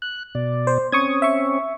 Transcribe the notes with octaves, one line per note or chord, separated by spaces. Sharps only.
F#6
B2 D5
C5
C4 C#4 C#6 D#6 G#6
E5 C#6